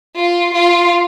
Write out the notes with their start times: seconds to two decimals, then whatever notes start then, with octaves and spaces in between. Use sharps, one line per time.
0.16 F4
0.54 F4